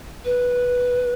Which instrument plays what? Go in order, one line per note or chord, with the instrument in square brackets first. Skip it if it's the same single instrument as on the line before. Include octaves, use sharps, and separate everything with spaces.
[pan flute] B4